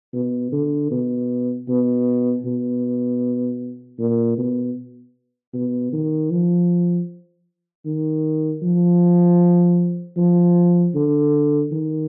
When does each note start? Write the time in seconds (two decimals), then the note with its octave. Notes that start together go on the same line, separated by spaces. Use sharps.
0.14 B2
0.52 D3
0.91 B2
1.68 B2
2.45 B2
3.99 A#2
4.38 B2
5.54 B2
5.93 D#3
6.31 F3
7.85 D#3
8.62 F3
10.17 F3
10.95 D3
11.72 D#3